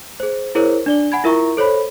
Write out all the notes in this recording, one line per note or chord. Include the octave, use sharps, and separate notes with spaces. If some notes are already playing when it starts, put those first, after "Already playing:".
G#4 C5
E4 G#4 A#4 C5 C#5
D4 D5 G7
F#5 G#5 B5 G#6
E4 F4 A#4 E5 A#5 C#6
A4 C5 C#5 B5